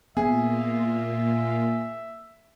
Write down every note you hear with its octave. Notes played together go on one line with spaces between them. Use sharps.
A#2 A#3 B3 F4 G#4 E5